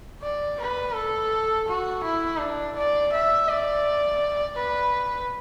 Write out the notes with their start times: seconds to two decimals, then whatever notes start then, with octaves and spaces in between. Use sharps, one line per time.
0.23 D5
0.60 B4
0.95 A4
1.68 F#4
2.04 E4
2.40 D4
2.76 D5
3.13 E5
3.49 D5
4.57 B4